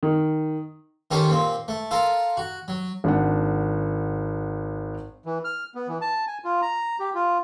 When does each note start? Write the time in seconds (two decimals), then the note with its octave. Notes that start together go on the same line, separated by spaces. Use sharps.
0.03 D#3
1.11 D#3 C#4 G4 A4 C5
1.30 A#2 C4
1.68 A3
1.91 F4 A4 A#4
2.37 F#4
2.68 F#3
3.04 G#1 D4 F#5
5.26 E3
5.45 F6
5.75 B3
5.88 E3
6.01 A5
6.27 G#5
6.45 F4
6.62 A#5
7.00 G4
7.15 F4